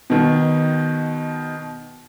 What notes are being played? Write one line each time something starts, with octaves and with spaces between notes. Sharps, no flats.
B2 D#3